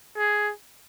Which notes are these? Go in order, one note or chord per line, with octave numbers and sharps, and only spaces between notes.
G#4